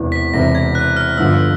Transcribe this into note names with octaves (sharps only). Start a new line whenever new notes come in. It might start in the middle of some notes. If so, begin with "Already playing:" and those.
Already playing: E1 E2 C3 E3
B6
E1 E2 C3 E3 A#6
G#6
F#6
F6
G1 G2 D3 F3 E6